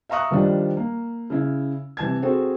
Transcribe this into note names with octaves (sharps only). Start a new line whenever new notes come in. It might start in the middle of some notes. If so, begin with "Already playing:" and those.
E5 F5 A#5 C#6 D#6 F#6
D#3 F3 G3 D4
A#3
C#3 E4
C3 E3 A5 G#6
C4 F#4 G#4 A4